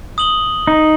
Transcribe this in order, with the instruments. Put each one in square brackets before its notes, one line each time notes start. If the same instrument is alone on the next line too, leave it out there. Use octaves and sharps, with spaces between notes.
[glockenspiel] D#6 F#7 G7
[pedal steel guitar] D#4